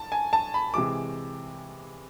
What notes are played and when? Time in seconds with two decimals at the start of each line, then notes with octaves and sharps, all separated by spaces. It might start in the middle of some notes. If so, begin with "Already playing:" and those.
Already playing: A5
0.12 G#5
0.33 A5
0.54 B5
0.74 C3 E3 G#3 D6